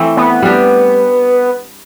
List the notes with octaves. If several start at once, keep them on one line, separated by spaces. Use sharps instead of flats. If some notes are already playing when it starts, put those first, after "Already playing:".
Already playing: E3 A3 C4
B3
G3 D4 G4